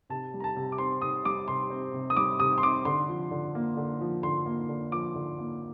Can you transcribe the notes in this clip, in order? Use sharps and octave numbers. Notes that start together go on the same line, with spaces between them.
C3 A5
G3
A#5
A5
C3
D6
C4 C6
C3 D#6
G3 D6
C3 C6
C4
C3
D#6
G3 D6
C3 D#6
C6
C4 D6
D3 C6
F3
D3
A#3
D3
F3
D3 C6
A#3
D3
F3 D6
D3
A#3